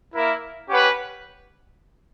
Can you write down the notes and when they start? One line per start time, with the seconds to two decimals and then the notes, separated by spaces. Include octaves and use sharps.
0.14 A#3 E4 A#4 E5
0.68 C#4 G4 B4 F#5